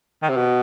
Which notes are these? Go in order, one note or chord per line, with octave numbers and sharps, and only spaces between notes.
D#3
C3
B2